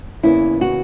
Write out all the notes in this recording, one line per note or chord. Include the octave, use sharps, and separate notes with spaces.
E2 C#3 E3 A#3 E4
F#4